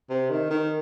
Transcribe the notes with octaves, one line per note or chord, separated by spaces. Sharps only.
C3
D#3
D#3